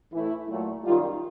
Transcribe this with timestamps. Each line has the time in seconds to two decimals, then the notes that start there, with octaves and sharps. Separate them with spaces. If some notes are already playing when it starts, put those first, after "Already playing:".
0.12 A2 E3 A3 E4
0.48 A#2 F#3 A3
0.85 F#2 D#3 G3 F4